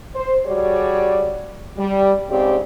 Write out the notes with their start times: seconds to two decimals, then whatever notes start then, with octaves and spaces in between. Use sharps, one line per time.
0.15 C5
0.46 G3 F#4 G#4 C#5 D5
1.78 G3
2.30 G#2 C#3 C4 G4 D5